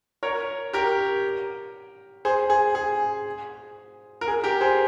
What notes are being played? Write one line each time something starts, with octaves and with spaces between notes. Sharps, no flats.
A#4 C#5
G4 A#4
G#4 C5
G#4
G#4
A#4
G#4
G4 A#4
G#4 C5